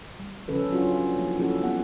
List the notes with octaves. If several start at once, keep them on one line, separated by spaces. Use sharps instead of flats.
G3
C#3 F3 C#4 A4 B4
F#3 C#4 D4 F4 F#4
F3 A#3 E4
F3 C#4 E4 F#4 A4
F3 G3 B3 F#4 G4 F#5